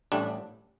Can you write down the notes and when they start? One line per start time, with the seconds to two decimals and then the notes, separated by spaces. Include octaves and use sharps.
0.12 A1 A2 G3 D4